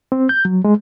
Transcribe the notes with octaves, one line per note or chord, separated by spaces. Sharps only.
C4
G6
F#3
G#3